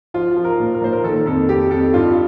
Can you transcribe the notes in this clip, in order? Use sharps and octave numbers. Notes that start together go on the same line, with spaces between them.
F3 F4
F3
A#4
A#2
A#4
A#2 C5
A#4
D#3 A4
F2 A4
F2 G4
F2 A4
G2 F4